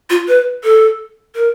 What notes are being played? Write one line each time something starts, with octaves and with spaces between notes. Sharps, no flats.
F4
B4
A4
A#4